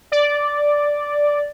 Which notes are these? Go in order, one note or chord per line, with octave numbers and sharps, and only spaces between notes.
D5